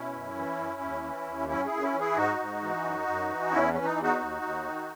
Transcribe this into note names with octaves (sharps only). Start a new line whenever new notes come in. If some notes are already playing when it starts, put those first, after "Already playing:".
Already playing: B2 C#4 E4
F#2
E3
F#2
D#2
E3
D#2
F#2 C#4 E4
E4 G#4
F#2
C#4 E4
E3
E4 G#4
G#2 D#4 F#4
G#2
E3
F#2
F#2
E3
E2 C#4 E4
E3 C#4
D#4
E2
D#4 F#4
D#2
D#2
D#3